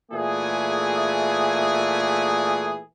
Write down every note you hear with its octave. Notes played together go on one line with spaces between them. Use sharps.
A#2 E3 A3 G#4